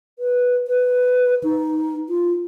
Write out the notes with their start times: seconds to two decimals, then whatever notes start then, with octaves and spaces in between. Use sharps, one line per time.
0.19 B4
0.68 B4
1.44 D#4
2.09 F4